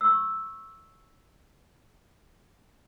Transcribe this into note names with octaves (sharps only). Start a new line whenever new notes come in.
C#6 E6